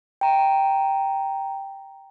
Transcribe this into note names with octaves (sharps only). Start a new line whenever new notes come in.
G5 A#5